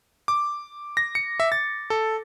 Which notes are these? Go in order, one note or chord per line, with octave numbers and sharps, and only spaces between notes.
D6
A#6
C#7
E5
A6
A4